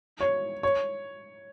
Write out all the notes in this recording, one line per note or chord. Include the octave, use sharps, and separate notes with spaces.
C#5
C#5